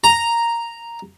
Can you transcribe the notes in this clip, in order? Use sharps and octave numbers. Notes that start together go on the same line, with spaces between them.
A#5